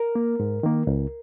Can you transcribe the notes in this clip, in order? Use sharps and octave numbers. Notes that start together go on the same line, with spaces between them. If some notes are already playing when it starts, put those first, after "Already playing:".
Already playing: A#4
A#3
G#2
D#3 A#3
C#2